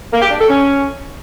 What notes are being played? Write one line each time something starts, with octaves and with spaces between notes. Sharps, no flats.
A#3
G4
D4
A4
C#4